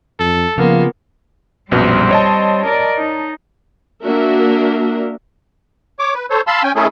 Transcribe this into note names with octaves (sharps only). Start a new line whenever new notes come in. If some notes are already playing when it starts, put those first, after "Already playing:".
F2 A4
C#3 F3 A#3 B3 F4
A#1 F#2 B2 G3 C4
C#5 D#5 A5
A#4 D5
D#4
A#3 D4 F#4 A#4 E5
C#5 D6
B4
A4 C5 C#5
F5 A5 B5 C6 E6
C#4 G5 G#5
D#3 A3 C#4 E4 G#4 A4